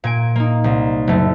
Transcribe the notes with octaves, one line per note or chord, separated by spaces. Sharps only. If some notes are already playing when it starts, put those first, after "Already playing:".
A#2 G#5 D7
A#3 D#4
C2
F#1 A3